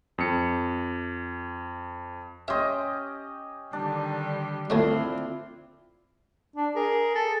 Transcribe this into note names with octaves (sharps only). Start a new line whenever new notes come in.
F2 C#7
C#4 G4 D#5 E5 C6
D3 D#3 G3 D4
D2 F3 A3 C4 D4 E4 F4
D4
G#4 A#4
A4